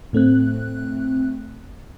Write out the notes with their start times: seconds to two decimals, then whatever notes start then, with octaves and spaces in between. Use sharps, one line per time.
0.13 A2 A3 C4 F#6